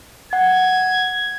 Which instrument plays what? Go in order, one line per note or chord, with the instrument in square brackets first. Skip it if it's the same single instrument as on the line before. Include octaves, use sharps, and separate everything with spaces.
[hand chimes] F#5 [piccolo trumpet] G#6